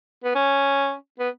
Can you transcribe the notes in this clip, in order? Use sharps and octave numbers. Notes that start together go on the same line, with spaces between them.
B3
C#4
B3